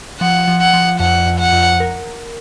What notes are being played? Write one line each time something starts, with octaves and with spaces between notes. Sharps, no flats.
F3 F#5
F3
F#5
F3
F2 F#5
F2
F#5
F2
A#4